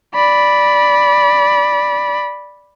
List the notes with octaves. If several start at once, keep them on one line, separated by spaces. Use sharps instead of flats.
D5 B5